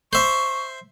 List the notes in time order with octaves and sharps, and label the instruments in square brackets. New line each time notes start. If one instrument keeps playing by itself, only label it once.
[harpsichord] C5 E5 [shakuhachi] C#6